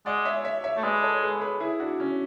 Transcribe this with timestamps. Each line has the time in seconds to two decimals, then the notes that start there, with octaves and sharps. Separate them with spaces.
0.06 G#3 D5 F#5
0.25 C#5 E5
0.44 C#5 E5
0.64 C#5 E5
0.76 A3
0.84 G#3 B4 D5
1.03 A4 C#5
1.22 G#4 B4
1.35 C#5
1.41 G#4 B4
1.60 E4 G#4
1.80 D4 F#4
2.00 C#4